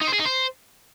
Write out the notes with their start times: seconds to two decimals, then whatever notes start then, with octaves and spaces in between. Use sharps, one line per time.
0.02 D#4
0.08 C5
0.14 G#4
0.20 D#4
0.26 C5